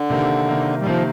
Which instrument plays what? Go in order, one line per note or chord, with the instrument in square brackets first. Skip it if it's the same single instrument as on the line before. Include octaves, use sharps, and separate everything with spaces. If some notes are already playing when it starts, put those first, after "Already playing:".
Already playing: [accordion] D3
[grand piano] C3 D#3 A#3
C3 D#3 A#3
[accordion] G3
[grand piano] C3 D#3 A#3 [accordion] F3